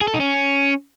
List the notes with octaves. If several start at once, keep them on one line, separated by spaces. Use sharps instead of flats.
G#4
A4
D#4
C#4